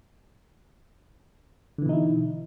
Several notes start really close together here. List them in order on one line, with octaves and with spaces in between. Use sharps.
D3 E3 B2 D#4 E4